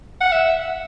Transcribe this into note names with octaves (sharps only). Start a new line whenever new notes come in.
F#5
E5